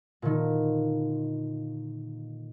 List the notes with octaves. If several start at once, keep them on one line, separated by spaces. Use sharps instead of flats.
A#2 D3 D#3